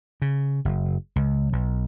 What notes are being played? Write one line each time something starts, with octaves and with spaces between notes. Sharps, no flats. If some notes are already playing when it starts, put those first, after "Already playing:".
C#3
F#1
C#2
B1